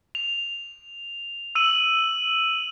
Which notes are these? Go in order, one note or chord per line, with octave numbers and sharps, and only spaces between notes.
F7
E6 D#7 F#7